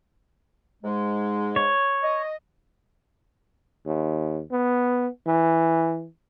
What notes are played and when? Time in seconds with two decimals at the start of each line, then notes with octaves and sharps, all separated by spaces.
0.83 G#2 G#3
1.56 C#5
2.03 D#5
3.86 D#2
4.52 B3
5.27 E3